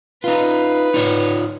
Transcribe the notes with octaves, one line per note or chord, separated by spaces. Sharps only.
D#4 F4 B4
D#4 F4 C#5